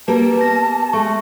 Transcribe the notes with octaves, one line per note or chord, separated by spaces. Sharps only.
A#3 G4 A#4 B4 A5
B3 A#6
G#3 A3 C#6